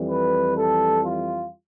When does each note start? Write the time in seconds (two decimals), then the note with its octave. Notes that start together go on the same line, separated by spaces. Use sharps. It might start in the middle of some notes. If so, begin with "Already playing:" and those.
Already playing: F2 E3 G3
0.10 B4
0.57 A4
1.04 F4